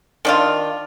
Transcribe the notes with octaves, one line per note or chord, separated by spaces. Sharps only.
D#3 D4 F4